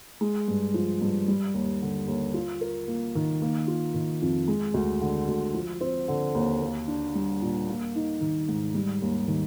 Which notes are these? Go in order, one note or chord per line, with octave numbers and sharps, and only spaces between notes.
G#3
G2
F3
G2
G3
D#2
D3
D#2
F4
A#4
A#3
D#3
A#3
F4
D#3
F2
G#3
D2
D3
D2
F3
C4
D3
D#2
A#3
D4
G3
A#2
A#3
D#4
D#3
G#2
G3
D#2
D#3